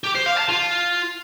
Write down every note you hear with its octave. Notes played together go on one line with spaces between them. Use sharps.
G4
C5
F5
A5
F4